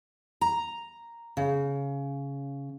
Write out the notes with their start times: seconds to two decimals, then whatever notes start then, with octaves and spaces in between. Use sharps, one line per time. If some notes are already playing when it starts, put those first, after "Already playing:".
0.41 A#5
1.37 C#3